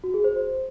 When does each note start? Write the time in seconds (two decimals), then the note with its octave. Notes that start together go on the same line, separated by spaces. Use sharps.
0.04 F#4
0.14 G#4
0.24 C5